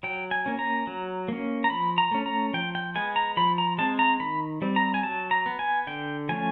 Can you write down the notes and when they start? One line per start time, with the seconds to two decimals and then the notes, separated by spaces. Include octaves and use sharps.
0.03 F#3 G5
0.31 G#5
0.46 A#3 C#4
0.59 A#5
0.87 F#3
1.28 A#3 C#4
1.64 A#5
1.70 F3 B5
1.98 A#5
2.11 A3 C#4
2.26 A#5
2.53 F3 G5
2.75 G5
2.95 G#3 B3 G#5
3.16 A#5
3.37 F3 B5
3.58 A#5
3.78 G#3 C4 A5
3.99 A#5
4.20 D#3 B5
4.62 G3 C4
4.76 A#5
4.94 G#5
5.03 F#3 A5
5.31 A#5
5.46 B3
5.59 G#5
5.87 D3 G5
6.29 F3 A3 C#4 G#5